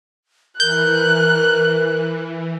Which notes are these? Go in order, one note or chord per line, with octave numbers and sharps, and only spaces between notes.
E3 A#4 F#6 G6